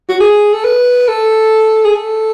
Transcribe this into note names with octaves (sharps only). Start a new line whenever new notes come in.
F#4
G#4
A4
B4
A4
G#4
A4